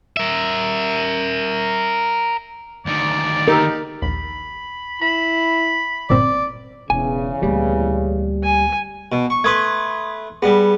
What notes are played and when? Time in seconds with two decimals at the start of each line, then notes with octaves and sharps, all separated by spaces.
0.17 A#4 E5
2.86 D2 D#3 D5
3.48 D#4 G4 A#4 E6
4.02 A#1 D#2 B5
5.01 E4 B5
6.10 G1 A#2 C4 D5
6.90 E1 E2 C#3 G#5
7.43 D2 A#2 G3
8.44 G#5
9.12 B2
9.30 C#6
9.44 A3 B4 C6 D#6 G#6
10.42 G3 B3 G#4